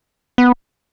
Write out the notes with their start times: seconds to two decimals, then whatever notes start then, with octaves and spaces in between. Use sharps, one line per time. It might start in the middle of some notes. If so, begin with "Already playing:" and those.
0.38 B3